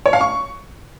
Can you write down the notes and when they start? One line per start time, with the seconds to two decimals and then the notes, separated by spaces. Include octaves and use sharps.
0.06 C#5
0.13 F5
0.21 C#6